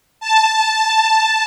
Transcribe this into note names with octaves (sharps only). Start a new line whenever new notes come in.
A5